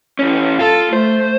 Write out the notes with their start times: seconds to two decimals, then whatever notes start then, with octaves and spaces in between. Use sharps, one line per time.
0.19 E3 C#4
0.59 F4 A4
0.93 A3 C5